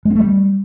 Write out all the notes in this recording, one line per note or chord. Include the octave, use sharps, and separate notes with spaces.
G#3
C4
A3
G3